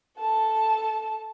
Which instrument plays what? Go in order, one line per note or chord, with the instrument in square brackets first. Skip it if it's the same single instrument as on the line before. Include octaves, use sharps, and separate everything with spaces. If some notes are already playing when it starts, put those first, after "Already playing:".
[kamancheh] A4 A5